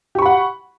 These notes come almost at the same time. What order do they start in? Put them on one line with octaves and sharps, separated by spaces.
G4 C#6 B5 F#5